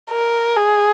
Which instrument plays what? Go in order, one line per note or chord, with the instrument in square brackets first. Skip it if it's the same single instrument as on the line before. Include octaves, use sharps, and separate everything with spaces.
[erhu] A#4
G#4